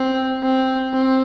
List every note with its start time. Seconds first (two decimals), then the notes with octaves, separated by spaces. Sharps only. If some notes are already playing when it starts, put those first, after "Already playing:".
Already playing: C4
0.42 C4
0.94 C4